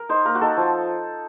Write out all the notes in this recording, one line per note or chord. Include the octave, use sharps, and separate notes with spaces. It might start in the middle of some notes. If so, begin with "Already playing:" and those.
Already playing: A#4
D#4 C5
A#3 A#4
F#4
D#4 A4
F3